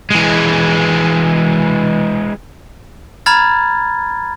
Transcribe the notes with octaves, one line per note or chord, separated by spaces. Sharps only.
E3 G#3
A#5 B5 F6 G#6 A6